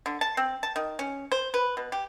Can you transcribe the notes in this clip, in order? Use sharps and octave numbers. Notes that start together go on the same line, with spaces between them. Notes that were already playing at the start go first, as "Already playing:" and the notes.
D3
A5
C4
A5
D#3
C#4
C5
B4
B2
G4